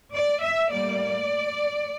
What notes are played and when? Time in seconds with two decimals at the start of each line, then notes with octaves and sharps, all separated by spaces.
0.11 D5
0.41 E5
0.70 A2 G3 A#3 D5